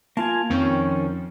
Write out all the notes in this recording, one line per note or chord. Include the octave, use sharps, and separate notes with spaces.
A#3 F4 G#5 A5
F2 D#3 F3 C4 C#4